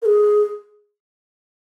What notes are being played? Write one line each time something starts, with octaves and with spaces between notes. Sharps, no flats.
A#4
G#4